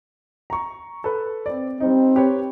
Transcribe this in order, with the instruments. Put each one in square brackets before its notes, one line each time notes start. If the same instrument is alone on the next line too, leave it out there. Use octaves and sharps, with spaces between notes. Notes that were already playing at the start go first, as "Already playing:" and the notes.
[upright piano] A#5 C#6
A4 B4
C4 D5
[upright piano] G3 D#4 [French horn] C4
[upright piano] G4 B4 C#5